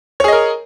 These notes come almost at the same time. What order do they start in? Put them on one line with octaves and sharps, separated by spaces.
C#5 G#4 D#5 A#4